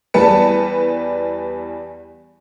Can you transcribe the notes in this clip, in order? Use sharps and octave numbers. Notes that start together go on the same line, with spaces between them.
E2 G3 B4 A5 C#7